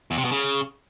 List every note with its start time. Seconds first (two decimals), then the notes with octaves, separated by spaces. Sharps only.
0.11 E2
0.18 C3
0.25 B2
0.32 C#3